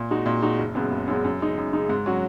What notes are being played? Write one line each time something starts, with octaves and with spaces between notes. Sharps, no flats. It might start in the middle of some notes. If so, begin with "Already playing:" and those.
Already playing: A#2
G#3 D#4 F#4
A#2
G#3 D#4 F#4
F#1
F#2 C#3 G#3 B3
F#1
F#2 C#3 G#3 B3
F#2
C#3 G#3 D#4
F#2
C#3 G#3 D#4
G#2
F#3 C#4 F#4